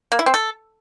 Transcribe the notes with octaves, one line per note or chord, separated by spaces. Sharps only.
A#3
E4
C4
A4